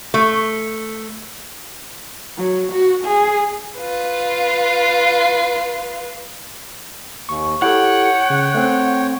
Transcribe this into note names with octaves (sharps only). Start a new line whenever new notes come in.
A3
F#3
F#4
G#4
F4 B4
D#2 C#6
E4 G4 A4 C#5 F#5 G5
C#3
A3 C4